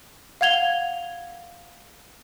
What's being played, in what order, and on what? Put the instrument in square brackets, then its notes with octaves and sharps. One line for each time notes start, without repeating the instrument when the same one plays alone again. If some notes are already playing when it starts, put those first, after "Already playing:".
[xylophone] F5 F#5 G#6 F7 G7